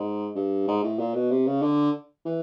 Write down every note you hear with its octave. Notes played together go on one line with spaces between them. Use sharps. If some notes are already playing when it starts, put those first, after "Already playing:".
Already playing: G#2
G2
G#2
A2
A#2
B2
C3
C#3
D3
E3